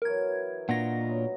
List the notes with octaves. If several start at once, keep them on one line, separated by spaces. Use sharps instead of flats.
E3 F#3 B3 A#4 G#6
A#2 D4 F4 D#5 F#5 C#6 A#6
F#3 G#3 B3